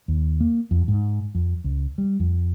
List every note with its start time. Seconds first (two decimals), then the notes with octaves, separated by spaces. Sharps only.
0.08 D#2
0.40 A#3
0.71 F2
0.88 G#2
1.35 F2
1.64 C#2
1.98 G3
2.20 F2